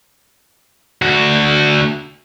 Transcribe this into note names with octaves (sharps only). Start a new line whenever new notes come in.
D2 F#4